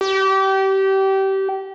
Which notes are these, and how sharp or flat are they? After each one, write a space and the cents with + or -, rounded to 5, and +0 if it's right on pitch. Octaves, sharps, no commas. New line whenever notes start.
G4 -25